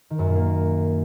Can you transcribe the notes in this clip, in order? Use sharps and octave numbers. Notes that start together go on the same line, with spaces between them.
D#3
F#2
A#2
A#3